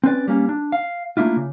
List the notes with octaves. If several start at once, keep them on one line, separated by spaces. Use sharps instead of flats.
C4 C#4 B4 D5
G3 A#3 C#4
D4
F5
A3 A#3 D4 E4 F4
C#3